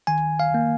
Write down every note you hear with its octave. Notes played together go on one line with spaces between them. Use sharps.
D#3 G#5
F5
A#3